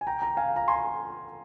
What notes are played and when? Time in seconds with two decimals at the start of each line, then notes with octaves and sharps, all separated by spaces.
0.01 G#5
0.07 G5 A#5
0.22 G5 A#5
0.37 F5 G#5
0.56 A#5
0.68 G#5 C6